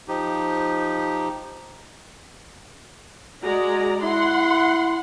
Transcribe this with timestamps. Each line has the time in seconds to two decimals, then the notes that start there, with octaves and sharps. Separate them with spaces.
0.08 F3 D#4 G4
3.43 G#3 F#4 D5 A#5
4.03 E4 F#5 C6